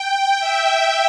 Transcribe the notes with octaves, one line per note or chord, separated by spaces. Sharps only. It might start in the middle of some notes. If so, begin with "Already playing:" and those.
Already playing: G5
E5